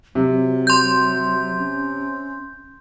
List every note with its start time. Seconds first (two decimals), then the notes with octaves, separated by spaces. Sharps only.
0.15 C3 F#3
0.67 C6 G6
1.58 C#4